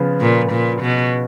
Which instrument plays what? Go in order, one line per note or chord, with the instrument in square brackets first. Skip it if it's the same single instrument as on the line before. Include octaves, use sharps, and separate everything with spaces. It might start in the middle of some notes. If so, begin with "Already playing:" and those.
Already playing: [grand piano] C#3 F3 B3 F4
[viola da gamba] A#2
A#2
B2